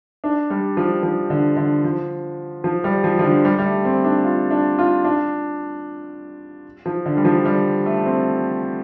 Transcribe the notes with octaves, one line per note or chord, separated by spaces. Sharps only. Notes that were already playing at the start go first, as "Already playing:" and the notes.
D4
G3
F3
F3
D3
D3
F3
F3
G3
F3
F3
D3
G3
G3
A3
C4
D4
F4
D4
F4
D4
F3
D3
G3
F3
G3
A3
C4